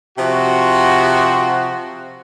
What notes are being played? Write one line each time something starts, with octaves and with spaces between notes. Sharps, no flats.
C3 F3 F#4